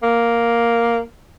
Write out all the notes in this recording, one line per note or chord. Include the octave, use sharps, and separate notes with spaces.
A#3